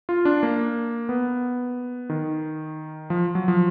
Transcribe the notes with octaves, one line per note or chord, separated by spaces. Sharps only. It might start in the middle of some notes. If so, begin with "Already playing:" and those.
F4
D4
A#3
B3
D#3
F3
F#3
F3